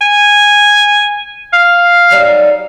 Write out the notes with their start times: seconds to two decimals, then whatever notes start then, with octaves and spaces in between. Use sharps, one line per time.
0.01 G#5
1.53 F5
2.11 F#3 G3 D#4